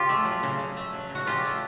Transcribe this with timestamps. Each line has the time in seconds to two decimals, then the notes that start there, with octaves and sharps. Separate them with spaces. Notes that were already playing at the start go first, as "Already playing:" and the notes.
Already playing: C#3 F4 G4
0.09 A3
0.25 F#3
0.43 C#3
0.59 C#3
0.76 A3
0.93 F#3
1.10 C#3
1.15 F#4
1.27 C#3 F4 G4
1.44 A3